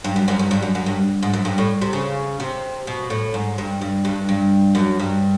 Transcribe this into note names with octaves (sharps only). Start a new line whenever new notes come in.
G2
F#2
F#2
G2
G2
F#2
F#2
G2
G#2
F#2
G2
A2
C3
C#3
C3
B2
A2
G#2
G2
G2
G2
G2
F#2
G2